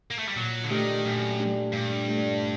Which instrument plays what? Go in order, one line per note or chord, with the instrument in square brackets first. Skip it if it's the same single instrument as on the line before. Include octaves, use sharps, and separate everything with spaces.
[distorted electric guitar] A#3
A3
G3
[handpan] A#2 [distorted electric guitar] F#3
[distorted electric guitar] D3
[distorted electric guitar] D#3 [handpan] A3 D4 G4
[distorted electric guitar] F#2 [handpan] A#2
[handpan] A3 D4 G4
[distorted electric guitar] G2 [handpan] A#2
[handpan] A3 D4 G4